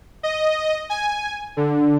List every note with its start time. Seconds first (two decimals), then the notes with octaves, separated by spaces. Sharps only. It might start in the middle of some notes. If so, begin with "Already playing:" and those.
0.23 D#5
0.90 G#5
1.57 D3